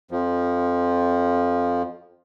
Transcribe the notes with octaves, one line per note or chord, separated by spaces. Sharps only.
F2 F3